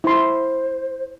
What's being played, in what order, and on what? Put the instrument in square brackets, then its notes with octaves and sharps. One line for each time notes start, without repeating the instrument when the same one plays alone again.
[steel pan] E4 C6 [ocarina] C5